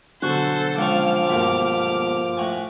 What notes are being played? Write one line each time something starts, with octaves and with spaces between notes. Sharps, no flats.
B2 D3 F#3 A4 C5 F#5 G#5 C#6
C#2 F3 C#4 D6 F6
G1 D#2 G#2 B2
A2 F#4 G#5